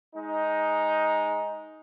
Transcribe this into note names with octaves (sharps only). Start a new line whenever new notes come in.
G#3 D#4